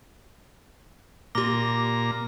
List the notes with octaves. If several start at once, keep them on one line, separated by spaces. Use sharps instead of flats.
A#2 G4 A#5 D6